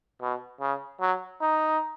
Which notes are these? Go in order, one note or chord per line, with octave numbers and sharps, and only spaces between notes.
B2
C#3
F#3
D#4